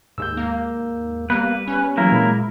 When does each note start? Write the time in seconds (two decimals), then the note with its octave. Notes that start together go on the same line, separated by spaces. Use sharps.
0.18 D#2 G#2 E6 G6
0.37 A#3
1.30 G3 A#3 B3 B4
1.68 C#4
1.97 E3 F#3 A#3 E4 A#4
2.12 A#2 G#3 B5